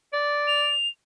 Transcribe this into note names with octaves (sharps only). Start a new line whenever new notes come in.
D5
F7